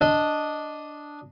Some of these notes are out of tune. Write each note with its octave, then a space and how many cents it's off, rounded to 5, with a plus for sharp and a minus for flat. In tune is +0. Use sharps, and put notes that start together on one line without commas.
D4 +0 D#5 +0